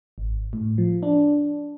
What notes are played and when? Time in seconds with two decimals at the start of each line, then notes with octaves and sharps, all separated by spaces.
0.18 G#1
0.53 A2
0.78 F3
1.03 D4